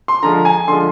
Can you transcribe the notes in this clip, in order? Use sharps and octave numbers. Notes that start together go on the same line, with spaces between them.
C6
D3 F3 G#3 A#5
G#5
D3 F3 G#3 C6